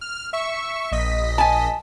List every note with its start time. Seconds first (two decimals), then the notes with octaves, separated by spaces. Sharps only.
0.01 F6
0.33 E5 C#6
0.92 A#1 D#5 B6
1.38 G#5 A5